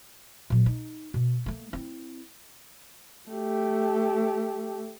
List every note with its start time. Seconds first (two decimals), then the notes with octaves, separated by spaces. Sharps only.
0.50 A#2 F#3
0.66 D#4
1.14 B2
1.46 A3 A#3
1.73 C4 E4
3.29 A3 G4